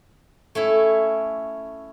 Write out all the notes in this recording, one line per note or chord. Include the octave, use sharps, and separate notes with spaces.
A3 C#4 E4